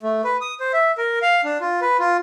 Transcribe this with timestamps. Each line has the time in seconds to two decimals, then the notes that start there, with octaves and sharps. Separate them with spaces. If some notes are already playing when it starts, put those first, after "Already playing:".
0.03 A3
0.24 B4
0.41 D#6
0.60 C5
0.73 E5
0.98 A#4
1.22 F5
1.44 D4
1.61 F4
1.81 B4
1.99 F4